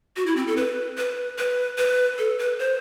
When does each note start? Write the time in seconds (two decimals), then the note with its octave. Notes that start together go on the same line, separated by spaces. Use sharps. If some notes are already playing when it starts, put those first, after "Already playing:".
0.16 F#4
0.26 E4
0.36 C4
0.47 A4
0.57 B4
0.98 B4
1.38 B4
1.78 B4
2.18 A4
2.39 B4
2.59 C5